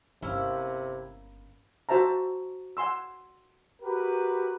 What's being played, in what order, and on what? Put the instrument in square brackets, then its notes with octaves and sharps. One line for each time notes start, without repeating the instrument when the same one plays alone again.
[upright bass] G1 [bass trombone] C3 [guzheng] A#3 C#4 [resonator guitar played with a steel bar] E4
[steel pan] F#4 C5 E5 A5 A#5
F#5 G#5 C6 E6
[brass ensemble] F#4 G4 A#4 B4